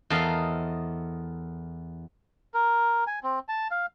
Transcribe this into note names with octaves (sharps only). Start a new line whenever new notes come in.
E2 A4 A#4 C5 D#5 F5
A#4
G#5
C4
A5
F5